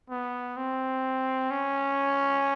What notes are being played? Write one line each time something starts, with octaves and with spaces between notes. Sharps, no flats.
B3
C4
C#4